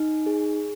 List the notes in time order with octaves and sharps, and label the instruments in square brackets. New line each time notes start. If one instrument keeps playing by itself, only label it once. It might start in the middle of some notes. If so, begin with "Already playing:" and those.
Already playing: [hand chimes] D#4
G#4